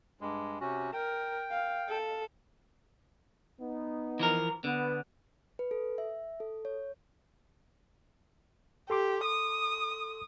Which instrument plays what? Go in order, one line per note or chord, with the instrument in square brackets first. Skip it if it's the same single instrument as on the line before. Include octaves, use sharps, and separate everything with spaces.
[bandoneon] G2 G#3
C3 C#4 F#4
[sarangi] A#4 [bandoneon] G5
[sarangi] F5
A4
[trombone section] B3 D#4
[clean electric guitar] E3 F3 A#4
[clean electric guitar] D3 [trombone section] B3
[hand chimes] B4
A4
E5
A4
C#5
[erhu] G4 [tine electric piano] A4 C6 D6
[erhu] D#6